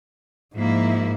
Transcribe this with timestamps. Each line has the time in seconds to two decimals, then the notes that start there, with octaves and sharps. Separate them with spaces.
0.55 G#2 F3 A#3 E4